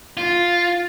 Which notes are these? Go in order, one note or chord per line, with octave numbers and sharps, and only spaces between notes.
F4